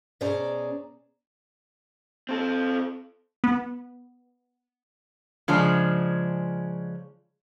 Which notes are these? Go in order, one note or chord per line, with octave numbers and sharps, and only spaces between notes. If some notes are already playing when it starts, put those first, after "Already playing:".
B2 C#4 G#4 C5 D5 A#5
C4 A4
B3
C#3 F3 G#3 C#4 D4